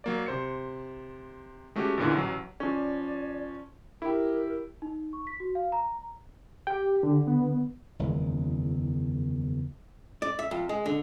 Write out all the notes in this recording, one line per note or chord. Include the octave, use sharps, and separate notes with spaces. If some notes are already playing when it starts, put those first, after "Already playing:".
F#3 A#3 D5
C3 C5 C#7
G#3 A3 C#4 F#4 G4
A1 E2 A#2 D3 E3
A1 F#3
F3 C#4 D5
E4 G4 A#4
D#4
C#6
B6
F#4
F5
A#5
G4 G5
D3
B3
F#1 E2 D#3 G#3
D5
E5
F2
G#3
D3